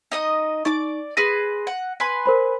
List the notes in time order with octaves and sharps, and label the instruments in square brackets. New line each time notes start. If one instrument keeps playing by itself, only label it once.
[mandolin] D#4 D#5 D#6
[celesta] D#4 C#6 [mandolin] D5 D6
[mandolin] G#4 B4 C6 [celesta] A#6 D#7
[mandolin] F#5
B4 G#5 C6
[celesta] A#4 C5 B5